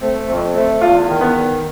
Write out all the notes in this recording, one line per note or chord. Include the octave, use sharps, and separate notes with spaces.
A3 C4
F2 C4
A3 C4
E2 F4
D#3
B3